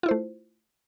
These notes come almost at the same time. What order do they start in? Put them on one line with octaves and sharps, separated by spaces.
F4 E4 C5 A3